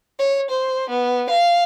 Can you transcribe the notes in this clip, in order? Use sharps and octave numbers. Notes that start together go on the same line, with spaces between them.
C#5
C5
B3
F5